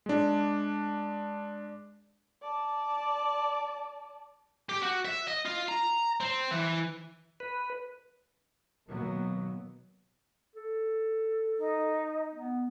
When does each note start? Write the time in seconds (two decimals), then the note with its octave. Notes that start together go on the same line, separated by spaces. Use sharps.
0.06 G#3 D4
2.42 D5 A5
4.69 G4
4.82 F#4
5.05 E5
5.28 D#5
5.45 F4
5.68 A#5
6.20 C4
6.51 E3
7.40 B4
8.87 B2 D#3 F#3 A#3 B3
10.55 A4
11.57 D#4
12.35 B3